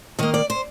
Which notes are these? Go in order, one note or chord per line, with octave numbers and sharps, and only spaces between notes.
D#3 A#3 D#5
D5
C5